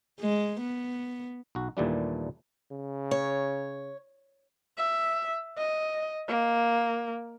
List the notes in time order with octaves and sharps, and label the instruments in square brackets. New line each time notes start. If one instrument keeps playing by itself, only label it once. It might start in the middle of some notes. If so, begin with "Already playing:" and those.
[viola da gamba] G#3
B3
[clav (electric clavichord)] B1 F#4
D#2 A#2 E3 G3 A3 D4
[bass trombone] C#3
[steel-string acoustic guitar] C#5
[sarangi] E5
D#5
A#3